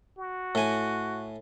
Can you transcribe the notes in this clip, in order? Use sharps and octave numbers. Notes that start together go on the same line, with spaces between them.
F#4
A2 G#5